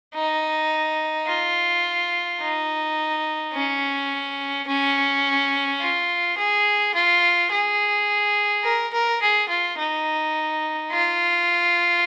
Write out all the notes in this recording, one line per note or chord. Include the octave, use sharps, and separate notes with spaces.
D#4
F4
D#4
C#4
C#4
F4
G#4
F4
G#4
A#4
A#4
G#4
F4
D#4
F4